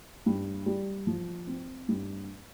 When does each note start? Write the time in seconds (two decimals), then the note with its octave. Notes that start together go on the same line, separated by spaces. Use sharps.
0.26 G2
0.66 G3
1.07 F3
1.47 C4
1.88 G2